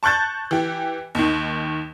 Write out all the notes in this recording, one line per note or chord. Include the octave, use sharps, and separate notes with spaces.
A5 C#6 F#6 G6 A6
E3 G4
D#2 D#3